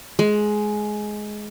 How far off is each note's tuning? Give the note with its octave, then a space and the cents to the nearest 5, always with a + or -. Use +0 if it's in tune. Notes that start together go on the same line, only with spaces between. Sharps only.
G#3 +15